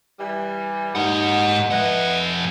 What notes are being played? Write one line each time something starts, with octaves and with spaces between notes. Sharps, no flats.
E3 G3
D#2 G#2 D#4 F#5
F2 E4 B4 D#5 F#5